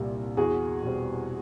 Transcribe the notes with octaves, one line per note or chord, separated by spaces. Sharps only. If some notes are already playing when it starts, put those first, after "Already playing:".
Already playing: C2 A#2 G3
E2 F#4 G#4
B2 G3 C4